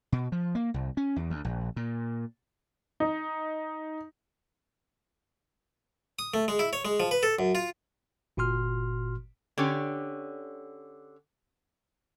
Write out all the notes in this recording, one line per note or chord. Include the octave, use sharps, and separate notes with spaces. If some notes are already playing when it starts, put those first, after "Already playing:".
B2
F3
A#3
C2
C#4
E2
D2
A#1
A#2
D#4
D#6
A3
G#3
E4
C#5
G#3
F3
B4
A4
F#2
F4
G1 A#2 F#4 C6 F6
D3 C#4 G4 C#5